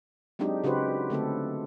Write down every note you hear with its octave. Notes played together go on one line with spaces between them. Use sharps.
F#3 G#3 C4 D4 D#4 G4
C#3 F#4 G4 B4 C5
D3 A3 C4 A4